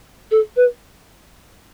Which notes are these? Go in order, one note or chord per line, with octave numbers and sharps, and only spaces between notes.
A4
B4